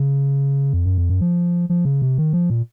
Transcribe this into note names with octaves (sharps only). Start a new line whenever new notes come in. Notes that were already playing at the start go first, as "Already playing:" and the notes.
Already playing: C#3
F2
F#2
F2
F#2
F3
F3
C#3
C3
D#3
F3
A#2